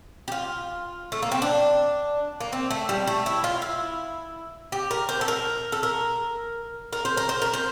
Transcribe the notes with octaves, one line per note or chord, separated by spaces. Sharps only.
G4
F4
A3
A#3
C4
D4
A#3
C4
A3
G3
A3
E4
F4
E4
G4
A#4
C5
A4
A#4
A4
A#4
A#4
C5
A#4
C5
A#4
C5